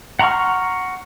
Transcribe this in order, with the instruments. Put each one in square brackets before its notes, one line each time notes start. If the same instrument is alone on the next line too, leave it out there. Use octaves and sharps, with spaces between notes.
[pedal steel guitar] F#5 A#5 C6 C#6 F6